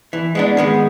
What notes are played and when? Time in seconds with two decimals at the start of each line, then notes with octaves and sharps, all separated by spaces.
0.13 E3
0.35 G#3 B3 D4
0.57 D#3 G#3 B3